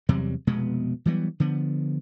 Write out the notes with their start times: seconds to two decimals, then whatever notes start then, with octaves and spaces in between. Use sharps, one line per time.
0.09 E2 C3 F#3 G3
0.47 F1 B2 G#3 B3
1.06 E3 F#3 G3 B3
1.40 D3 F3 B3